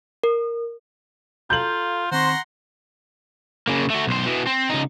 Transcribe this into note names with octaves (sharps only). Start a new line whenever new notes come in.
A#4
F4 A4 F5 A#5 G6 F#7
D#3 C4 C5 F#5 A#5 C6 C#6
C#3 A#3
A3 F#4
B1 C5
B2 E3
C4
C#2 D#4